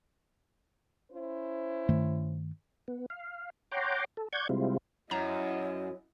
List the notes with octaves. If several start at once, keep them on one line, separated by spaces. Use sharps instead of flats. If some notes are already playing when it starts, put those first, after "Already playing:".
C#4 E4 C5
G2 D#3 A3
B3
F5
C#5 F#5 G5 A#5 C6 D6
A4
D5 F#5 C#6 G6 G#6
C3 G3 G#3 C4 E4 F4
F#2 E4 C#5 D#5 A#5